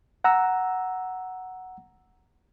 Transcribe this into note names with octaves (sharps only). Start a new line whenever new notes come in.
F#5 A#5 E6